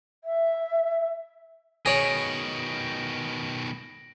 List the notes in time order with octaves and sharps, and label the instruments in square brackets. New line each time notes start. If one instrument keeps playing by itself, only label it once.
[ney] E5
[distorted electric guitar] B2 D#3 [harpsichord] G#4 C#5 [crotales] A#6 D7 F#7